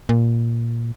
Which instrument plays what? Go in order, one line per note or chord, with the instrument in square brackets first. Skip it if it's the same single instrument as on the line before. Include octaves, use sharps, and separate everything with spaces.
[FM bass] A#2